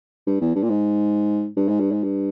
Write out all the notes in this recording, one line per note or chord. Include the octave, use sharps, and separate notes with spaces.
G2
E2
G2
A#2
G#2
G2
G#2
G2
G#2
G2